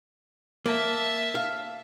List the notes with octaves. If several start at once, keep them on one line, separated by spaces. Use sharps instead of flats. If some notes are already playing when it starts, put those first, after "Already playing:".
A#3 E5 A5
F5